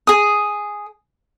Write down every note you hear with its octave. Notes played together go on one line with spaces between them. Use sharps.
G#4 D#6